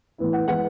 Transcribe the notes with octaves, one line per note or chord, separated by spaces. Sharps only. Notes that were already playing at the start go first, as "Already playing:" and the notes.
A2 E3 B3 E4
F#5
E3 G#3 B3 F#5